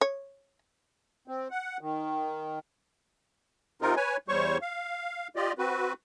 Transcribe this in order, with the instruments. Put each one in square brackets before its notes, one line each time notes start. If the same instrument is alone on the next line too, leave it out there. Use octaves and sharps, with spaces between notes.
[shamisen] C#5
[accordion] C4
F#5
D#3
C3 C4 D#4 F4 A#4
B4 C#5 G#5
E2 G3 C5 C#5 C#6
F5
F4 G4 D5 D#5
C4 F#4 B4